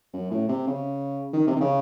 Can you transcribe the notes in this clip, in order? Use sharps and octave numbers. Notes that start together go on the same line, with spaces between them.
F#2
A2
C3
C#3
D#3
C3
D#3
C#3